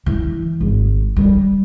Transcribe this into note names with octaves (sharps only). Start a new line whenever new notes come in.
E3
G#1
G3